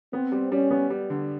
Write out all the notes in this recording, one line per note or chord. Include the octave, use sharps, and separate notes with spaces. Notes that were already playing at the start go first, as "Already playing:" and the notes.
B3 C4
G3
G3 C#4
B3
G3
D3